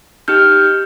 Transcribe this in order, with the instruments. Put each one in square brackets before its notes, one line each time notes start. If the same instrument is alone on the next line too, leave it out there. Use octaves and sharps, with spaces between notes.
[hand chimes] D#4 G4 F6 G6